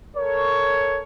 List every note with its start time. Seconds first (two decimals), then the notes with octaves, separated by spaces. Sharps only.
0.17 A4 A#4 C#5